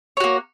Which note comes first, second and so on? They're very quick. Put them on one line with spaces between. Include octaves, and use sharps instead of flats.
C#5 F#4 A#3